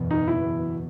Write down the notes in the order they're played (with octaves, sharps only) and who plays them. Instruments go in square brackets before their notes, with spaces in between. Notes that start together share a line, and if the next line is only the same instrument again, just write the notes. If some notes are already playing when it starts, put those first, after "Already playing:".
Already playing: [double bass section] F#1 E2 B2
[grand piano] D#4
E4